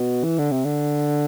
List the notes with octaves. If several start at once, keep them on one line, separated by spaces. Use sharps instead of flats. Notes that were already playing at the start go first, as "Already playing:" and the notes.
Already playing: B2
E3
D3
C3
D3